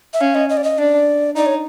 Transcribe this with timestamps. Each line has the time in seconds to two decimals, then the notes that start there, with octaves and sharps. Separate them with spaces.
0.14 E5
0.21 C#4 F5
0.35 D#5
0.49 D#5
0.57 D5
0.64 D#5
0.78 D4 D5
1.36 D#4 D5
1.46 C#5